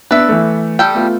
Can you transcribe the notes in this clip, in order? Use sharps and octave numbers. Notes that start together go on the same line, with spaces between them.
B3 D4 B4 E5
E3 A3
G3 A4 G5
A3 B3 F4